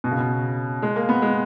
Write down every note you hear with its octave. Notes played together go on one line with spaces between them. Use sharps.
B2
C#3
B2
G#3
A#3
B3
G#3